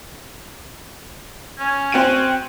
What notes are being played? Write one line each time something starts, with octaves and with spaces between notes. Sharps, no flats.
C#4
C4 F#4 D#7